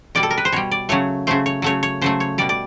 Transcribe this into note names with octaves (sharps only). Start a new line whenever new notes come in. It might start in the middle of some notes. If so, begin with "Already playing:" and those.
B2 G3 D5
A4
A#4
B4
C5
B2 G3 C#5
D5
C#3 F#3 A3 C#5
C#3 F#3 A3 C5
C#5
C#3 F#3 A3 C#5
C#5
C#3 F#3 A3 C5
C#5
B2 G3 D5
D5